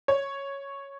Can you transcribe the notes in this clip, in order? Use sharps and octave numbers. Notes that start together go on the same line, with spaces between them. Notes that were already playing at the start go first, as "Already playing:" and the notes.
C#5